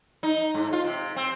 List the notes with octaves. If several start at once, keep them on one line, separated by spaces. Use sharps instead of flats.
D#4
G#2
F4
C3
C4